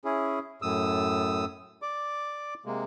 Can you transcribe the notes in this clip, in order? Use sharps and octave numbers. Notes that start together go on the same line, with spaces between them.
C#4 E4 G#4
F#2 A2 D#6 E6
D5 D6
C3 G#3 A#3